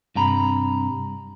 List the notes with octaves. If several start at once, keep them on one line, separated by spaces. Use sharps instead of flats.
G2 C3 A#5 B5